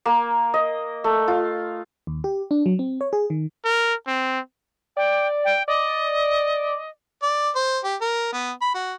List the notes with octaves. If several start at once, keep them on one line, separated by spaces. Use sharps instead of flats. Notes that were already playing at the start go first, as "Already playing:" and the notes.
A#3
D#5
A3
F4
D#2
G4
D4
F#3
C4
C#5
G#4
D#3
A#4
C4
D5 G5
G5
D5 D#5
D5
C5
G4
A#4
B3
B5
F#4